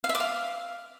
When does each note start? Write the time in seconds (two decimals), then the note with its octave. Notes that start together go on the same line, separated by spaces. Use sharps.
0.04 F5
0.09 E5
0.15 D6
0.20 F5